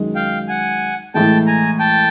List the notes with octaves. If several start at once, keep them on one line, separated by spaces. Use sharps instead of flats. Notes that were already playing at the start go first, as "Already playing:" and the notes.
Already playing: F#2 D#3 G#3
F5 G5
F#5 G#5
A2 E3 G#3 G5 A5
G#5 A#5
G5 A5